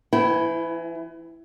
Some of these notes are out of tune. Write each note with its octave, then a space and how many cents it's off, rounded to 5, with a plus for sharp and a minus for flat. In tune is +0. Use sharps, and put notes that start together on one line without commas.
E3 +35 E4 +0 G5 -25